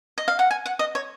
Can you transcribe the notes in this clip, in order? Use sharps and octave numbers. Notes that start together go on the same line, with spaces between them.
D#5
F5
F#5
G#5
F#5
D#5
C#5